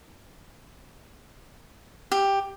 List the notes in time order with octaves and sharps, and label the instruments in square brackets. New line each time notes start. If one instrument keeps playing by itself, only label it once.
[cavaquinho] G4